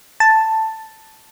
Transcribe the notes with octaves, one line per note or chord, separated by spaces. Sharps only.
A5